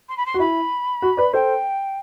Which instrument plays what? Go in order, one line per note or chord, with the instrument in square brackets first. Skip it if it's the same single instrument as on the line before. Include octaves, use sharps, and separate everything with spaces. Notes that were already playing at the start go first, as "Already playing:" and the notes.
[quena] C6
B5
C6
[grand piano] F#4
[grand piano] E4 [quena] B5
[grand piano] F#4
B4 D5
[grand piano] A4 C5 [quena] G5